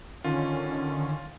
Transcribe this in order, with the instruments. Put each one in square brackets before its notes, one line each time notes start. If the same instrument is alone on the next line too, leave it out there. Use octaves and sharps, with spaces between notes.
[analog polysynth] D3 D#3 C#4 [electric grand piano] F4